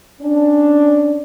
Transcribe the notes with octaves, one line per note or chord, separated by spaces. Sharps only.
C#4 D4